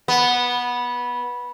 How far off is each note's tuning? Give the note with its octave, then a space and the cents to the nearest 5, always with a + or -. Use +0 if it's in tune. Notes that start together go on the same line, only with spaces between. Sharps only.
B3 -15